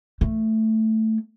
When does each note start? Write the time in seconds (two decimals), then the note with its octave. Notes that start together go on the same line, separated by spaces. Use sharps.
0.21 A3